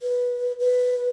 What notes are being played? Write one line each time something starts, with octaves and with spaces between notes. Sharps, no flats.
B4
B4